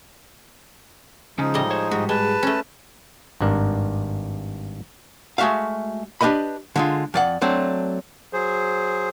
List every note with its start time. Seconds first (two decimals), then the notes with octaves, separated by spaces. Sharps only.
1.39 C#3 F3 G#3 C#4 D#4
1.54 A2 G3 D#5
1.71 C5 C#5
1.91 G#2 G3 F#4
2.09 G#3 B4 A5
2.43 A3 C#4
3.41 G#1 G2 D4 A#4
5.38 G#3 A3 F#4 E5 F5
6.21 D4 G4 B4 D#5 B5
6.76 D3 G#3 F4
7.14 F2 D5 F#5
7.42 F#3 A3 C4 D4
8.33 F#3 G#4 C5